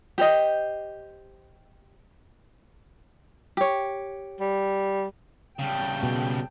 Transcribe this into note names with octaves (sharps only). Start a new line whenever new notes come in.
G4 C5 D#5
G4 C#5
G3
C#3 G3 G5 A5 G6
B2